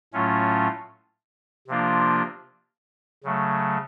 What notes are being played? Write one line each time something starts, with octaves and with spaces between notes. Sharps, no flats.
A2 F#3 A3 C#4 F4
C3 F3 A#3 D4 F4
C#3 F#3 A3